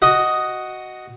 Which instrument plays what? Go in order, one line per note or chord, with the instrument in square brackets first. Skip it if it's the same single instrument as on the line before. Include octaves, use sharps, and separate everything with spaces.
[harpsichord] F#4 D#5